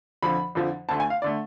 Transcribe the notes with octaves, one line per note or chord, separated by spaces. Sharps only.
F2 D3 F3 B5
F2 D3 F3
D2 D3 A3 A5
G#5
F5
D3 A3 D5